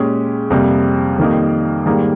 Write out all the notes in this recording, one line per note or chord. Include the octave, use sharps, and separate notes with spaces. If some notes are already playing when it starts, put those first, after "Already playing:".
Already playing: A#2 G#3 C#4 G4
F2 C3 G3 A#3
F2 D#3 G3 A#3 D#4
G#2 D#3 G3 A#3